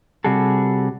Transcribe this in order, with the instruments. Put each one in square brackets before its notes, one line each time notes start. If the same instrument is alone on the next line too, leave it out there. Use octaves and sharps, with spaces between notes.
[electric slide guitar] C3 G3 F#4 G#4 A4